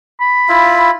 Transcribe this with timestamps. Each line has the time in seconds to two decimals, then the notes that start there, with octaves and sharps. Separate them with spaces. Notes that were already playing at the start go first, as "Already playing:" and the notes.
0.21 B5
0.49 E4 F4